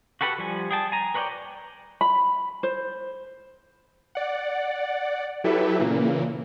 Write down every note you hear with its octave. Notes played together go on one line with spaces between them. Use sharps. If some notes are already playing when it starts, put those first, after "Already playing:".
F#4 G4 A4 B4 F#5
F3 G3 G#5
G#4 G5 A5
G#5 A#5
A#4 B4 C#5 D5 G5
B5
C5
D5 F#5
F#3 E4 G4 A4 B4 E5
A#2 C#3 E3 A#3